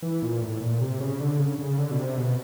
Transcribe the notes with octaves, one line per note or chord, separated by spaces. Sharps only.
E3
A#2
A2
A#2
C3
C#3
D3
C#3
C#3
D3
B2
C3
B2